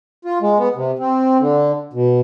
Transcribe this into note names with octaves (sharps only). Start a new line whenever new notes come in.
F4
G#3
B3
C3
C4
D3
B2